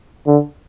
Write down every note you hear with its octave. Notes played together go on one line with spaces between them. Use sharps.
D3